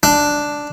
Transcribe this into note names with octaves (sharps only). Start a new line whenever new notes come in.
D4